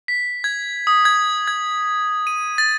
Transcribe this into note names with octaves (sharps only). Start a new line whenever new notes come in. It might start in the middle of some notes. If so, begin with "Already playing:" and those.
B6
G#6
D#6
G#6
G#6
D#7
A6